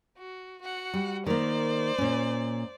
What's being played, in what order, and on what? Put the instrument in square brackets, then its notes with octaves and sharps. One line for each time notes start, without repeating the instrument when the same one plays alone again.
[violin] F#4
F#4 F#5
[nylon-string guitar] G3
[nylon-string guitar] D#3 A#3 [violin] C5 D5
[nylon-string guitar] A#2 C#4